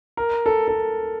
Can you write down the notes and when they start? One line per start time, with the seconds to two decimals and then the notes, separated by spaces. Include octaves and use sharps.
0.17 A#4
0.46 A4
0.68 A4